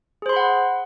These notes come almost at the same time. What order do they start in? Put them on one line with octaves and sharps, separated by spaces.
G#4 C5 C6 B5 F#5